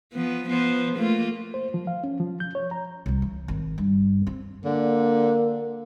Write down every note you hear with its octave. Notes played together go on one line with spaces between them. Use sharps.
F3 B3
F3 B3 C5
A3 A#3 F4
C5
F3
F5
C#4
F3
G6
C#5
A#5
C2 F3
E3
G#1
G2
C4
D3 A#3